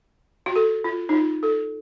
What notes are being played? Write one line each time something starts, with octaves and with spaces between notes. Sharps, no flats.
F#4
A4
F4
D#4
F4
A4